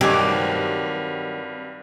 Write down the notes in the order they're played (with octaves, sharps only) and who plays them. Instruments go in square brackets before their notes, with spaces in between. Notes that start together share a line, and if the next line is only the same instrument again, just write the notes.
[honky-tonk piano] G2 [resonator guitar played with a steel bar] D#3 F#3 [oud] C4 [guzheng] G4 D5 G#5